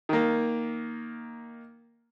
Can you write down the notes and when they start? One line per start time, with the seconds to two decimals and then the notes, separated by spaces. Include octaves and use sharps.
0.09 D#3 A#3